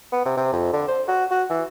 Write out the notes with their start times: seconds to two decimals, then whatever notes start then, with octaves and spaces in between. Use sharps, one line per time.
0.12 B3
0.25 C3
0.37 C3
0.53 F2
0.73 D3
0.88 C5
1.08 F#4
1.31 F#4
1.50 E3